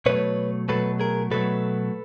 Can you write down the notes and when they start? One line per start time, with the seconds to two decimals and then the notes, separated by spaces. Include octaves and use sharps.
0.06 B2 F#3 A3 B4 C#5
0.68 B2 F#3 A3 A4 B4
1.00 G#4 A#4
1.31 B2 F#3 A3 A4 B4